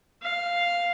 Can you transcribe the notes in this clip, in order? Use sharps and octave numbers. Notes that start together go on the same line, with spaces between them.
F5